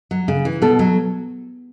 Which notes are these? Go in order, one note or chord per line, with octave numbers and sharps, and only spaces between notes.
F#3
C#3
E3
B2 A4
F#3